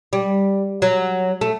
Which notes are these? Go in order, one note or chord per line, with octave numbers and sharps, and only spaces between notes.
G3
F#3
A3